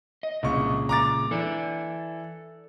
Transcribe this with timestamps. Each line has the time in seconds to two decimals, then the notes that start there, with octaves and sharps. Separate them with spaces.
0.23 D#5
0.43 C2 A#2 C#3 G#3 C#6
0.89 A#5 D6 A6
1.31 E3 A4 D5